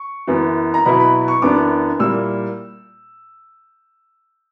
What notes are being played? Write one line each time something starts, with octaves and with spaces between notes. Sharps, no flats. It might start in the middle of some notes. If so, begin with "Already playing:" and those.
Already playing: C#6
F#2 E3 B3
A#5
B2 F#3 B3 E4 B5
B5
C#6
F#2 E3 B3 D4 D6
A#2 G3 A#3 E4 E6